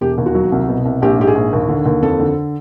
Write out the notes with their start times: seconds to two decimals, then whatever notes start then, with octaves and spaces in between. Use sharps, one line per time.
0.01 E1 G4
0.18 D#2
0.26 F#4
0.35 F#3
0.52 C2
0.68 B2
0.85 C2
1.02 A#1 G4
1.19 G#2 G4
1.27 G#4
1.35 A#1
1.53 D#2
1.69 D3
1.86 D#2
2.02 F2 A4
2.19 D3